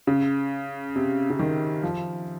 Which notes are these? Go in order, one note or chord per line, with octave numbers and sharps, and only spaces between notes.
C#3
C3
C#3
D#3
F3